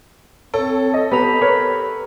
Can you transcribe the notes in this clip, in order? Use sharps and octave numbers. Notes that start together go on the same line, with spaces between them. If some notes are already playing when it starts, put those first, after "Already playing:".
C4 A4 C#5
D#5
B3 G4 A4 A#5 B5
A#4 B4 C#5